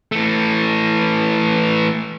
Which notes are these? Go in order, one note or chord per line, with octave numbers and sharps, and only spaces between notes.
E3 A3